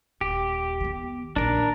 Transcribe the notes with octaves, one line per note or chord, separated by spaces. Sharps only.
D#1 G4
D#3 B3
A#1 D#3 D4 A#4